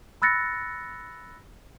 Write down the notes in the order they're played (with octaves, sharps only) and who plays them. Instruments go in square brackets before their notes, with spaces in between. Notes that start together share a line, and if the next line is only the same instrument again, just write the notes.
[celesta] B5 E6 F#6 A6 A#6 C#7